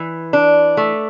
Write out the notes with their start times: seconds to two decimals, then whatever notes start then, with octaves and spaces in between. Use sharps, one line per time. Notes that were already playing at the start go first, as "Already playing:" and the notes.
Already playing: E3
0.33 D4
0.77 A3